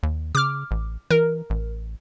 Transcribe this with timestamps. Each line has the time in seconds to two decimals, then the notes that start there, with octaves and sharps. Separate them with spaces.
0.03 D#2
0.35 C#3 D6 F6
0.71 A1
1.10 E3 A#4
1.50 A1